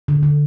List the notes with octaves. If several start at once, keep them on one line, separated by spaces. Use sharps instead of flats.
D3
D3